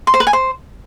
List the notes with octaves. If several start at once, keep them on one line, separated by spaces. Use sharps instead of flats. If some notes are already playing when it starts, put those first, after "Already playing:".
C6
C5
B4
G#5
C5